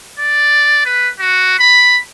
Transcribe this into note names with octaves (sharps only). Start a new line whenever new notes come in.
D5
B4
F#4
B5